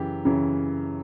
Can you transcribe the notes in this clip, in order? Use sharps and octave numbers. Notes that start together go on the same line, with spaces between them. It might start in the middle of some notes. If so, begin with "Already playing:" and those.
Already playing: F#2 C#3 E3 G4
F#2 C#3 E3